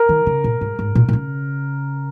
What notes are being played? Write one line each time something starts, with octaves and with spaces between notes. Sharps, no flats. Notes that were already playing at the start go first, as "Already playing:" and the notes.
Already playing: A#4
D#3
C#3
A#2
G#2
G#2
A#2
A#2
C#3